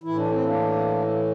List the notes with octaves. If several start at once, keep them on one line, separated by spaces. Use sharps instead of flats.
A2 E3 E4
D4
C4
A#3 D4